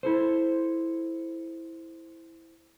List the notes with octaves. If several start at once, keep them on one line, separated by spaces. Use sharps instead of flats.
E4 A4 C5